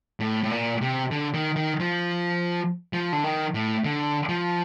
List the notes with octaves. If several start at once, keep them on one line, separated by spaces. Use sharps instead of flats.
A2
A2
A#2
C3
D3
D#3
D#3
F3
F3
D3
D#3
A2
D3
F3